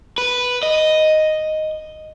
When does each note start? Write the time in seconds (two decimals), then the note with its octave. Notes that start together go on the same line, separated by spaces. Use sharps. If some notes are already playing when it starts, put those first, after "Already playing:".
0.18 B4
0.63 D#5